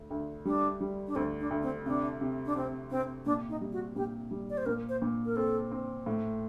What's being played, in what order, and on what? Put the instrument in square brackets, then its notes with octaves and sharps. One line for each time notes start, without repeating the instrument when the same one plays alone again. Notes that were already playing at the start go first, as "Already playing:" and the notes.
Already playing: [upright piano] D2
D2
[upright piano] G3 [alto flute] D4
[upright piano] G3
[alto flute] D4
[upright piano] D2 [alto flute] C4
[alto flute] D4
[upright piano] D2
[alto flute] C4
[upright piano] C3 [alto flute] D4
[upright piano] C3
[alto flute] D4
[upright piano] C3 [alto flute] C4
[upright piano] C3 [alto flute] C4
[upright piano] A#2 [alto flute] D4
[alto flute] D#4
[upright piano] G3
[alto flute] F#4
[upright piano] A#2 [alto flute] G4
[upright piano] G3
[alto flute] D5
C5
[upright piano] A#2 [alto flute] A#4
[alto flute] C5
[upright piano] A#2
[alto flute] A#4
[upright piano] C4 [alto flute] A4
[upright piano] C4
A2